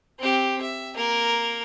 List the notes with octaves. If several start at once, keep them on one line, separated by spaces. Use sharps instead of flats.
C4 G4
E5
A#3 A#4